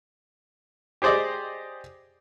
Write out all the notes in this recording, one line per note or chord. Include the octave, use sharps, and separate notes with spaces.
G4 G#4 C5 D5 D#5